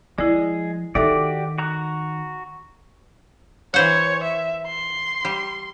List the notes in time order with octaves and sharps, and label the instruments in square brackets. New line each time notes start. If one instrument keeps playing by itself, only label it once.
[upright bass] F3 [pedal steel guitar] G#3 G#4 [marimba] E4 D5
[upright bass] D#3 [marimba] D#4 A4 E5 [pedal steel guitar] F#4 G4 D5
[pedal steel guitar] F#4 A#5 F#6
[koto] E3 C5 F#5 [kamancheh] C#5
[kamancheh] E5
C6
[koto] G3